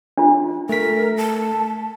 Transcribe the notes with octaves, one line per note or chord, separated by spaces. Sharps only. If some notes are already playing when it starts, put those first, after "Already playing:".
D4 F4
A3 A#4 B6
A5